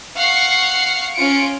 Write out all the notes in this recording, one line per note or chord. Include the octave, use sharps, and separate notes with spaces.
F5 F#5 C#6 C7
C#4 F4 C#7 D7